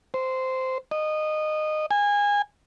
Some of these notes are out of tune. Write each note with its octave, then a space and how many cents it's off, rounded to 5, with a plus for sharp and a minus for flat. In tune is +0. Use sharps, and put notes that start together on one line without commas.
C5 -10
D#5 -15
G#5 -25